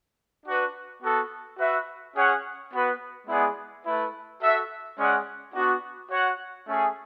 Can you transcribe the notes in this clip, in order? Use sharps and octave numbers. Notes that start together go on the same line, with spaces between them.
D4 F#4 B4
B3 F#4 A4
F#4 B4 E5
C#4 G#4 C#5 F#5
B3 F#4 B4
G#3 B3 E4 G#4 D5
A3 E4 B4
F#4 A4 E5
G#3 C#4 G#4 D5 F#5
B3 D4 F#4
F#4 C#5 F#5
A3 C#4 G#4